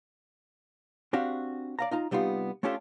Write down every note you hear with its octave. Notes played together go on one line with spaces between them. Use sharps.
C4 D4 F#4 G4 F5
D5 F5 A#5
D#4 F4 A#5
C3 G3 B3 D#4 F4
A3 C#4 D4 F4 G4 A4